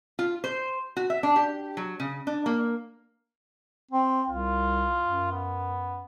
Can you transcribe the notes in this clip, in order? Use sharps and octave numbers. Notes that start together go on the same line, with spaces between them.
F4
C5
F#4
E5
D4
G4
F#3
C#3
D4
A#3
C4
C2 F4
F#2
B3